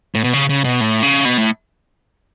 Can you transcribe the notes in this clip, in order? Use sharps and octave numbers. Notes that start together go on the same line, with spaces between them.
A2
B2
C#3
C#3
B2
A2
C#3
B2
A2